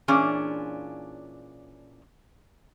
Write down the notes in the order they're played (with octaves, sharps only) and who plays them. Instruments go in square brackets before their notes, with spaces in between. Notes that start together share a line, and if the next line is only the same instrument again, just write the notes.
[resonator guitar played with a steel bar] A#2 E3 C#4 D4 F4 G#4